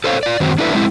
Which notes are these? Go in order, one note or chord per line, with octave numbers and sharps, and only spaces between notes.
A4 C5 C#5 F5
F4 D5
F#2 D#3 F#3 C4
D4 E4 A4 B4 D5 E5
G#3 C4 E4